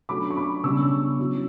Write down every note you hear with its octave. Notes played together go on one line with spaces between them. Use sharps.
F#3 A3 D4 B5 D6
C#6
B5 D6
C#3 G3 B3 D4 C#6 E6
F#3 C#4 E4